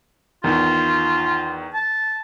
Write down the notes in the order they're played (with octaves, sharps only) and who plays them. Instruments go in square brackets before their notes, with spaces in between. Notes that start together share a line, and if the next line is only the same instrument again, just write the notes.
[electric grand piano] E2 D#3 [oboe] F4
[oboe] A5